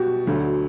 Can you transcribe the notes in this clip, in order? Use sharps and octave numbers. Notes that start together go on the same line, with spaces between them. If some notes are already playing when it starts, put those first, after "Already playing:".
Already playing: B2 F#3 F#4 G4
D2 D3 F#3